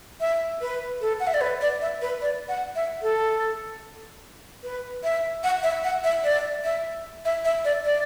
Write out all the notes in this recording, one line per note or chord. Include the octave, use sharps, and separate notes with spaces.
E5
B4
A4
F#5
E5
D5
B4
D5
E5
B4
D5
F#5
E5
A4
B4
E5
F#5
E5
F#5
E5
D5
E5
E5
E5
D5
D5